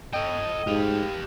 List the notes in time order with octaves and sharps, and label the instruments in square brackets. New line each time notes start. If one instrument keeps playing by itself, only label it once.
[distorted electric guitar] A4 G5 [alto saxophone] D#5
[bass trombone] G#2 [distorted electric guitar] G4 F5